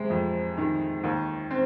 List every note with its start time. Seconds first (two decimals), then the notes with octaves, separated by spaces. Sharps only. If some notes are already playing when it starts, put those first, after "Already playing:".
Already playing: C3 G#3
0.10 F2
0.58 D#3
1.04 D#2
1.51 C4